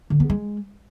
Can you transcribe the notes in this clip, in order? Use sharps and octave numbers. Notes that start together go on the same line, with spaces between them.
D3
B3
G#3